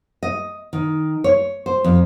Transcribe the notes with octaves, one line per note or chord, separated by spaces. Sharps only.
D#5
D#3
C#5
C5
F2